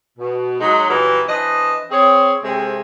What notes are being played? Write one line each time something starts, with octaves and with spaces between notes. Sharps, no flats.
B2
F#3 G#3 D#4
A#2 E3 F#3 G3 D#4 A#4
E3 D4 B4 C5 D#5
C4 G#4 C#5
C3 G#3 A3 C4